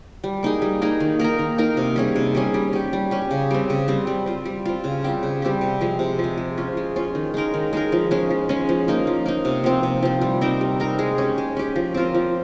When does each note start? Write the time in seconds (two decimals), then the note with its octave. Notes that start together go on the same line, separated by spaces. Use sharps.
0.24 G3
0.43 A#3 D#4 G#4
0.62 G3
0.82 A#3 D#4 G#4
1.00 D#3
1.19 A#3 D#4 A#4
1.39 D#3
1.58 A#3 D#4 A#4
1.77 C3
1.96 G3 C#4 G#4
2.16 C3
2.35 G3 C#4 G#4
2.54 G3
2.73 C#4 G4
2.93 G3
3.11 C#4 G4
3.31 C#3
3.51 G3 C4
3.70 C#3
3.88 G3 C4
4.07 G3
4.26 C4 F4
4.45 G3
4.65 C4 F4
4.84 C#3
5.04 G3 C4 G4
5.23 C#3
5.42 G3 C4 G4
5.61 C3
5.81 F3 G#3
5.99 C3
6.19 F3 G#3
6.37 G#3
6.58 C#4 F4
6.77 G#3
6.96 C#4 F4
7.15 D#3
7.34 G#3 D#4 A#4
7.54 D#3
7.73 G#3 D#4 A#4
7.92 F3
8.11 G#3 C#4
8.30 F3
8.49 G#3 C#4
8.69 F3
8.88 A#3 D#4
9.07 F3
9.26 A#3 D#4
9.45 C3
9.64 F3 C4
9.83 C3
10.03 F3 C4
10.21 G3
10.41 C4 D#4 A#4
10.61 G3
10.80 C4 D#4 A#4
10.99 G#3
11.18 C#4 G4
11.38 G#3
11.57 C#4 G4
11.76 F3
11.94 C4 F4 A#4
12.15 F3